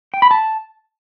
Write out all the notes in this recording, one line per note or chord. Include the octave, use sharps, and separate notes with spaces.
G5
B5
A5